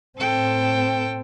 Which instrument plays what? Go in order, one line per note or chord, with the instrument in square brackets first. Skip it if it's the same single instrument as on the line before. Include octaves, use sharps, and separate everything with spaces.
[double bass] A2 C4 [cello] A4 G5